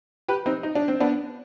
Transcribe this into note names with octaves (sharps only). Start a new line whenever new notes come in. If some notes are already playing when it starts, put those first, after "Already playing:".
G4 B4
C4 D#4
D#4
D4
C4
B3 D4